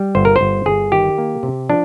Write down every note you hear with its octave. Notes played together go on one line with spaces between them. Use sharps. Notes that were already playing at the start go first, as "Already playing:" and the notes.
Already playing: G3
G1 C5
A#4
C5
G1
G1 G#4
D#3 G4
A#3
C3
F3 D4